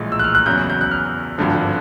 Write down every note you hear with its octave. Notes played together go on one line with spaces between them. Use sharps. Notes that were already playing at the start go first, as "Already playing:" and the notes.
Already playing: A#1 A2 E3 G#3
E6
F#6
F6
F#6
E2 C#3 F#3 G6
F#6
G6
F#6
F6
G#1 G2 D3 F3